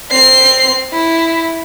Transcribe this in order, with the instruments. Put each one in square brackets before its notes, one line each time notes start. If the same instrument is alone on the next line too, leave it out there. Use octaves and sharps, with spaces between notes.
[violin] C4 C7
E4